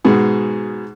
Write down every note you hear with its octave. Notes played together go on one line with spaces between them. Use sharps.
G#2 B2 G#4